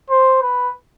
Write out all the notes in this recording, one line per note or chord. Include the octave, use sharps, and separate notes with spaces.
C5
B4